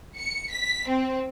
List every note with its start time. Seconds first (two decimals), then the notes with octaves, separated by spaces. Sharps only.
0.17 C#7
0.51 B6
0.89 C4